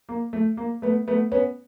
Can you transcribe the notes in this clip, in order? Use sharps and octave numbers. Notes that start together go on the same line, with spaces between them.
A#3
A3
A#3
A3 B3
A3 B3
B3 C#4